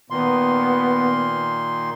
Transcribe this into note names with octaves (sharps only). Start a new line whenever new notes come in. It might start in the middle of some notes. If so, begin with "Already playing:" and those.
A#2 D#3 B3 C6